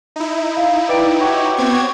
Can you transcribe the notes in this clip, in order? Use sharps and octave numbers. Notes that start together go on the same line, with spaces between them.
D#4 E4
F5
B4 D5 G5 D7
F#4 G4 C#5
B3 C4 G#6